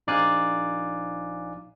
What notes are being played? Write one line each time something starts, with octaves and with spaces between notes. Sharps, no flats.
A#1 D#4 D5 F5 G#5 F#6